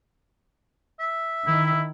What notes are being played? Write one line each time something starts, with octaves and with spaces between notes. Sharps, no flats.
E5
D#3 E4